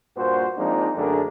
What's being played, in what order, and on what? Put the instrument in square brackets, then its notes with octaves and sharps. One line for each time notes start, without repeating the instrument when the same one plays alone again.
[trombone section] G2 A#2 F#4 C5
F3 G#3 A#3 C4 D4 D#4
F#2 D3 A3 D4 G#4 A#4